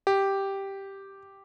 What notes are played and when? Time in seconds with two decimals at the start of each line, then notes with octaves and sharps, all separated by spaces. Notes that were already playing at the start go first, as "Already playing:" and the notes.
0.07 G4